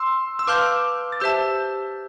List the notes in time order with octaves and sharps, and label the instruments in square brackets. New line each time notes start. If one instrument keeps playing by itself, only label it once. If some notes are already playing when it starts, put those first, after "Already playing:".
Already playing: [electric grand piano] C6 E6
E6
[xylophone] B4 F5 A5 C6 G6 [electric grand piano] D6 F6
[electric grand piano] A6
[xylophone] G4 C5 E5 A5 [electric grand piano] E6 G6